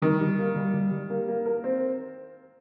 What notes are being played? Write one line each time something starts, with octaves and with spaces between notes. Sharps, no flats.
D#3 G3
G3
A#3
G3
G3
G3
A#3
A#3
A#4
C4